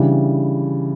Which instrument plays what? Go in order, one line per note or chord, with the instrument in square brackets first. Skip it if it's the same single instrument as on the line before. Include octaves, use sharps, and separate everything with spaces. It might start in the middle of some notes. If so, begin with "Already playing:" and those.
Already playing: [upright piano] C#3 E3 G3 D4